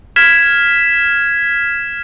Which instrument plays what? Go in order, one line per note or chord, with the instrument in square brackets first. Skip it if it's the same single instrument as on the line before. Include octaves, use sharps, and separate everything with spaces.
[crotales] F6 G#6 B6 E7